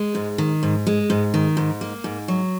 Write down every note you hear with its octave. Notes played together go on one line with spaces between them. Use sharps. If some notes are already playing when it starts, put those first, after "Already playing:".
Already playing: G#3
G#2
D#3
G#2
G#3
G#2
D#3
G#2
A#3
G#2
F#3